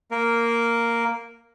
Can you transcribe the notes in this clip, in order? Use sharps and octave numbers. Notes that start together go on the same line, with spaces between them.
A#3 A#4